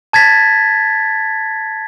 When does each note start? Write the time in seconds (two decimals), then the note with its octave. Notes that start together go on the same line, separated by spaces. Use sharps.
0.13 A5 G#6 A6 B6